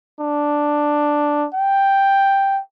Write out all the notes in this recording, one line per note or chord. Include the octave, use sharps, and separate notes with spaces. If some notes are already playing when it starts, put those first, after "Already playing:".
D4
G5